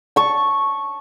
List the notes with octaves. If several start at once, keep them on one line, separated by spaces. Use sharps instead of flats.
A5 C#6